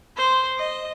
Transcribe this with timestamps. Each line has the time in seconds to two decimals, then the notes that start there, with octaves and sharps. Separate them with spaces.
0.17 C5
0.58 D#5